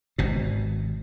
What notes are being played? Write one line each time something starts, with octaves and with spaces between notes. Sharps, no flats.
G#1 B2